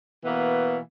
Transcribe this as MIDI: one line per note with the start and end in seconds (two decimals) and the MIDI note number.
0.25 0.79 47
0.25 0.79 52
0.25 0.79 58
0.25 0.79 59